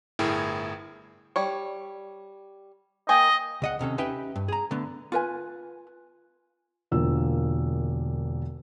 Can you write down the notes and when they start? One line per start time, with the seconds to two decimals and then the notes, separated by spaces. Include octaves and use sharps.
0.19 G1 A2 E4 G#4 A#4 G5
1.36 G3 C#5
3.09 A#3 D#5 G5 G#5
3.62 C#2 D#5 F#5
3.79 D#2 C3 C#4 A4
3.98 C#4 D#4 G4 B4 E5 G5
4.36 G2
4.48 G#4 A#5
4.71 D3 A3 B3
5.12 F4 B4 G#5
6.91 E1 D3 A#3 F4 E6